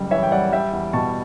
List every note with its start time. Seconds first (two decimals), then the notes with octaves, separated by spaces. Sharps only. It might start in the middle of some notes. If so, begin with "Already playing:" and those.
Already playing: F#1 G3
0.11 E3 C#5 E5
0.23 G5
0.31 G3 D5 F#5
0.52 G3 E5 G5
0.73 E2
0.93 B2 A5 C#6